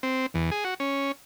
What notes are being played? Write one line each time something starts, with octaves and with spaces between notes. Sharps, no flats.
C4
E2
G#4
F#4
C#4